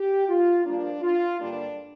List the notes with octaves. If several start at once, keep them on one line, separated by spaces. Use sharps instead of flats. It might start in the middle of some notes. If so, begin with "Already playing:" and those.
Already playing: G4
F4
G2 F3 A#3 D4
F4
G2 D3 G3 A#3 D4